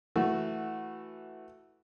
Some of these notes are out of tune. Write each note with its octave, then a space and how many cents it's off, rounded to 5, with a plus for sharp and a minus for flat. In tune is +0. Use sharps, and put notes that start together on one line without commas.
E3 +0 A3 +0 F#4 +0